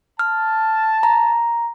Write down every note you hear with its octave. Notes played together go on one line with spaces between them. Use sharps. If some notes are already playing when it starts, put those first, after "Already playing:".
A5 F6
A#5